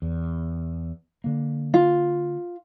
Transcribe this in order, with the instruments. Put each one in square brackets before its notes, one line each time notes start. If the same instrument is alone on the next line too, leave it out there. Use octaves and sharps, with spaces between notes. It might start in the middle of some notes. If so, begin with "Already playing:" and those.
[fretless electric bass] E2
D3 A#3
[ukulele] F4